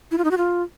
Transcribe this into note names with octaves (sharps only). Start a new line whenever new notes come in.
E4
F4
D#4
F#4
F4